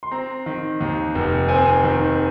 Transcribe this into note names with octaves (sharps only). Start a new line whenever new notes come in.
C6
C4 A#5
D#3
D#2
F1
C4 G#5
D#3